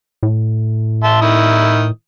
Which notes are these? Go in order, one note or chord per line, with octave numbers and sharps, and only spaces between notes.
A2
E5 A5 C6
D#3 E4 D#6